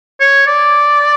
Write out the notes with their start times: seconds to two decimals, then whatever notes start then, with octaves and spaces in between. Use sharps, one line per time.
0.20 C#5
0.47 D5